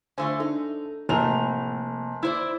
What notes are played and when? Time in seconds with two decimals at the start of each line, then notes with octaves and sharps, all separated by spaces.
0.18 D3 A3 F4 C5 G#5
0.40 D4 D#4 A4
1.09 F1 A2 A#3 F7
2.23 E4 C5 D5 E6